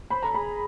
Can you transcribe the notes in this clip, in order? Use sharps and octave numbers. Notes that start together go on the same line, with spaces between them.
C5 B5
A4 A#5
G#4 B5